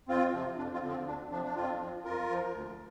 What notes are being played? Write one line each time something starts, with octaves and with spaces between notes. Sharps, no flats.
F2 C4 F4
C3 F3
F2 D4
C4 F4
D3 F3
C4
D2 D4
C3 F3 D4
D4
F2 C4 F4
F3
F2 F4 A#4
F3
D2